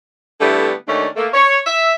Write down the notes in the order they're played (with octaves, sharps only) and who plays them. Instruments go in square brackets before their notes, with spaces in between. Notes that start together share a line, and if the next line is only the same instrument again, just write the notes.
[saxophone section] D3 G3 A3 B3 E4 G4
D#2 D#3 A3 C#4 D4
A3 A#3
C#5
E5